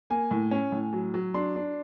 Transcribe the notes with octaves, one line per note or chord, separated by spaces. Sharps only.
A#3 G#5
A2
C#4
A2
F#3
F#3
D4 C6
D4